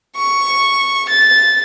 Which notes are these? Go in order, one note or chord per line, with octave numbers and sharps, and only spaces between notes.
C#6
A6